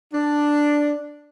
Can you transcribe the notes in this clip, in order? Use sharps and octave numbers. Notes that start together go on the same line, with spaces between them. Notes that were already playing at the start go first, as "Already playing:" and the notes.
D4